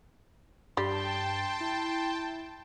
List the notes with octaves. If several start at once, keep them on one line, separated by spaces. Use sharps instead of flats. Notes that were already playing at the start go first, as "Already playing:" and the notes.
G2 G3 G5 A5 C6
E4